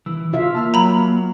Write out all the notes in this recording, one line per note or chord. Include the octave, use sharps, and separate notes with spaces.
E3 E4 E6
C#3 E4 F4 E5 F5
A#3 A5 E6 F6
F#3 A#5 B5